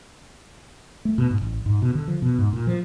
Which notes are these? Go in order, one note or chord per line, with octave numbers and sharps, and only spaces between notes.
A3
B2
G#2
A1
G#2
B2
D3
F3
B2
G#2
A#2
F3